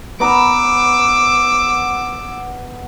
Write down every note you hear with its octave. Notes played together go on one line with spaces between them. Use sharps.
B3 A#5 D6 E6